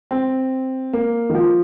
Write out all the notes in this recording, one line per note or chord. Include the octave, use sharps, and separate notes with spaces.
C4
A#3
D#3
F3